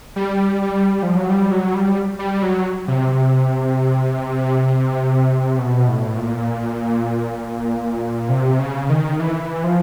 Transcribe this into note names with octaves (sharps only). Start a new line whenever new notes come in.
G3
G3
F3
F#3
G3
F#3
G3
G3
F#3
C3
B2
A2
A#2
C3
C#3
D#3
E3
F3